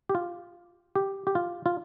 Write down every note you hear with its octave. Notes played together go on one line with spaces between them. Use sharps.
G4
F4
G4
G4
F4
F4